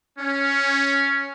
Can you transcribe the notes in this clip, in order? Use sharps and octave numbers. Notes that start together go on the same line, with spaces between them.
C#4